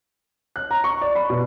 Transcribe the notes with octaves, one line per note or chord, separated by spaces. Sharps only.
F#6
A#5
C#6
D5
B5
B2